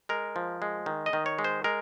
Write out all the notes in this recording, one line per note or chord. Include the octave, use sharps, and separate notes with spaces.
G#3 A#4
F3
G#3
D#3
D#5
D#3
C#5
G#3
C5
G#3 A#4